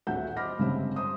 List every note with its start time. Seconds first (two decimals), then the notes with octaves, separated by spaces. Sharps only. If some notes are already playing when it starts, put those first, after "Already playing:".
0.07 D#1 A#1 F#4 E5 F#5 G6
0.37 C5 D#5 B5 D6 F6 A#6
0.59 G1 C#3 G3 G#3 C4 E5
0.96 C5 D#6